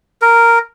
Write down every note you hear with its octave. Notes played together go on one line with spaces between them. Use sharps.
A#4